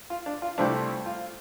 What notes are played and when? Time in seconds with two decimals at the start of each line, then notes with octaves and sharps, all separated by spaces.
0.10 F4
0.26 D4
0.42 F4
0.58 C2 C3 F3 A3 C4 D4
1.06 F4